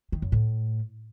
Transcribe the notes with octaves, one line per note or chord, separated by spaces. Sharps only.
D#3
F#2
A2